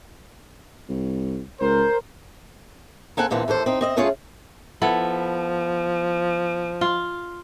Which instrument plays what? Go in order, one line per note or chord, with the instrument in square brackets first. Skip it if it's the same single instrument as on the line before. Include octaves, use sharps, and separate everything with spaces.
[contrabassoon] C2
[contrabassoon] C#2 [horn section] A#4 C5
[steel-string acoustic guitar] A#3 C4 A4 F#5 G#5
D#2 A#2 D3 E3 C4
D#2 E3 A4 C5
C4 D#4
C4 D#5 E5
D2 A3 C#4 F4 G#4 C#5
[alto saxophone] F3 [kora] B3 E4 A4
[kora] F4